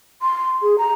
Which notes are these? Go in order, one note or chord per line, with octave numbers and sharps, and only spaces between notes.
C6
G#4
A#5